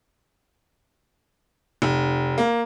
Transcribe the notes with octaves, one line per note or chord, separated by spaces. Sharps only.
F1
A#3